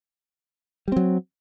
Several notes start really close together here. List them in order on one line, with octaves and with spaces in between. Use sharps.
G3 C4 F#3